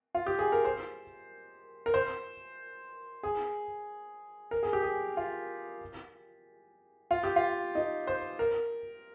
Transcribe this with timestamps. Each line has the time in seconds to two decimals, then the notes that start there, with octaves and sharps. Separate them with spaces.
0.15 F4
0.26 G4
0.39 G#4
0.52 A#4
0.65 C5
1.86 A#4
1.94 C5
3.23 G#4
4.51 A#4
4.63 G#4
4.73 G4
4.83 G#4
5.17 F4
7.11 F4
7.23 G4
7.36 F4
7.75 D#4
8.07 C5
8.39 A#4